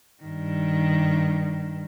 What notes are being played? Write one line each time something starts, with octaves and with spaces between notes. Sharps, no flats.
G2 D#3